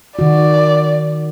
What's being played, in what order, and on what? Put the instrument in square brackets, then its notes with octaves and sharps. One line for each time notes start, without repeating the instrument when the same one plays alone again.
[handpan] D#3 F#4 [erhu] D5